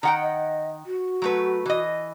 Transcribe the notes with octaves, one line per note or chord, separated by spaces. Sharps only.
D#3 F#5 G5 A#5
D#5
F#4
F#3 A3 B4
E3 D#5